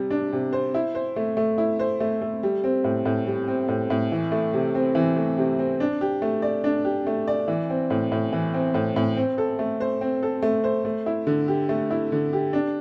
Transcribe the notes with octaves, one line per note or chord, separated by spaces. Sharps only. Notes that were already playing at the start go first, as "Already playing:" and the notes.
Already playing: C3 G3
D4
C3
C5
E4
C5
A3
A3
E4
C5
A3
A3
G3
C4
A2
A2
G3
C4
A2
A2
E3
A3
C3
C4
E3
A3
C3
C4
D4
G4
A3
D5
D4
G4
A3
D5
E3
C4
A2
A2
E3
C4
A2
A2
C4
A4
A3
C5
C4
A4
A3
C5
A3
E4
D3
G4
A3
E4
D3
G4
D4